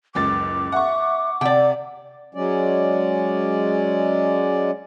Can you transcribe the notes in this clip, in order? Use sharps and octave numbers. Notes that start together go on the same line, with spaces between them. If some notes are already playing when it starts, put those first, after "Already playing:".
F#1 C#2 D6 A6
E5 F#5 C#6
C3 D5 F#5 G5
F#3 G#3 C#4 D5